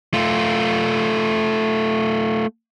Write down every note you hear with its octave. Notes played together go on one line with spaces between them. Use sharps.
A3 F4